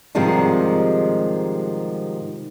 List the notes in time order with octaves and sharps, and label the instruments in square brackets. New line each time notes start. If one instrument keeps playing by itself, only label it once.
[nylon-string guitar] G#2 C3 D#3 F3 G3 G#3